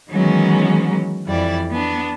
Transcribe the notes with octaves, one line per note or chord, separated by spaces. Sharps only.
D#3 E3 F#3 G#3 B3 C#4
F2 E3 G3 D5
B3 D4